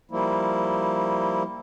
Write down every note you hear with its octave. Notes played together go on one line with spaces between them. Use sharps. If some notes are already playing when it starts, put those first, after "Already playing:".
F3 G3 A#3 E4